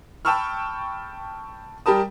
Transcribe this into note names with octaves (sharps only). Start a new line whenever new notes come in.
G5 A5 B5 C#6 E6 F6
G3 G4 A#4 A5 D#6